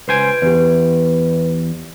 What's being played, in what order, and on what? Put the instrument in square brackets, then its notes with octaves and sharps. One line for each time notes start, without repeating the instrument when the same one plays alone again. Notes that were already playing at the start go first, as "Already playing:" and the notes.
[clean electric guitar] C#2 C5 G#5 [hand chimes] B4 G6 D7
[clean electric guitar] E2 [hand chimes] G4 B4